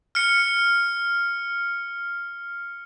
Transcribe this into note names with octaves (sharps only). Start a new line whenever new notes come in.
F6 C#7